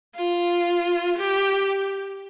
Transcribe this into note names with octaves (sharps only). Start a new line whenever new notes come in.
F4
G4